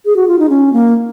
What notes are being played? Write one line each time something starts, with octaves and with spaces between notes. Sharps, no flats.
G#4
F#4
F4
D#4
C#4
A#3